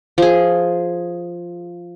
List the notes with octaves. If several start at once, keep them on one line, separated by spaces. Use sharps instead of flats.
F3 G#4